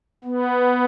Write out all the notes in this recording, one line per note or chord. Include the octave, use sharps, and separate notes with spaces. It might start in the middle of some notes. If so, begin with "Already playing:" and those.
B3